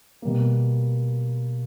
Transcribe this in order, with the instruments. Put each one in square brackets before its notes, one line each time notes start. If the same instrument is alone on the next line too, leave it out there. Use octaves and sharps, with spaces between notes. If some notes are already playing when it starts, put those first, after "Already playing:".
[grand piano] B2 G3 A#3